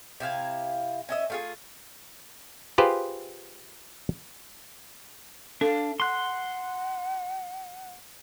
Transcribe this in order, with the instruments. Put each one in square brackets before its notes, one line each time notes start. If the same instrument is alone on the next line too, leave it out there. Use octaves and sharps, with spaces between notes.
[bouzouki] C3 E4 F5 G#5
C#4 D#5 E5
A3 F4 G#4
[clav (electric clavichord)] F4 G4 G#4 B4 C5
[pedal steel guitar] D4 [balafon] A4 [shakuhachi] F5
[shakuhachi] F#5 [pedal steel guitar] C6 F#6